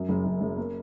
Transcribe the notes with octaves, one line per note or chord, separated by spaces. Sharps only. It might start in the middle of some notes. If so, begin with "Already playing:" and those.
Already playing: F#2
F#1
F#1
F#1
A#3